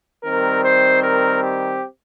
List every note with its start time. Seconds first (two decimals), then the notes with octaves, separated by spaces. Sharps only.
0.24 D#3 G3 C4 A#4
0.64 C5
1.03 A#4
1.43 G4